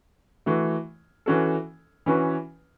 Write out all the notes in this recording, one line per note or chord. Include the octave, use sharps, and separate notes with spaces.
E3 A3 F#4
E3 C#4 F#4 A4
E3 C#4 F#4 B4